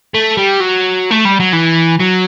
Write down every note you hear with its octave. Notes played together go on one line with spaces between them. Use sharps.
A3
G3
F#3
A3
G3
F#3
E3
F#3